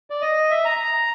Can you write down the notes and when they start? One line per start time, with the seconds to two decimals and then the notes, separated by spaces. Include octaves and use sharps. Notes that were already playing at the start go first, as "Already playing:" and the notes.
0.10 D5
0.22 D#5
0.51 E5
0.65 A#5
0.80 A#5